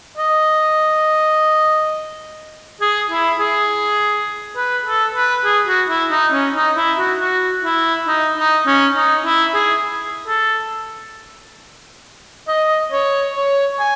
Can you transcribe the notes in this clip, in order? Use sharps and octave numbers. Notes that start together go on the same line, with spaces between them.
D#5
G#4
E4
G#4
B4
A4
B4
G#4
F#4
E4
D#4
C#4
D#4
E4
F#4
F#4
E4
D#4
D#4
C#4
D#4
E4
G#4
A4
D#5
C#5
C#5
G#5